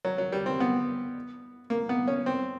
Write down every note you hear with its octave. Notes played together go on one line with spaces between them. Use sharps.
F#3
F#3
G3
C4
B3
A#3
B3
C#4
C4